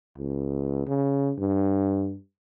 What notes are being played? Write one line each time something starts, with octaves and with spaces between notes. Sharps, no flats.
C#2
C#3
G2